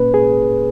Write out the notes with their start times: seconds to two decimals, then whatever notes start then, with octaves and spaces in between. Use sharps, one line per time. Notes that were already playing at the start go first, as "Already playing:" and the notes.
Already playing: A#2 A#3 C#4 B4
0.14 G#4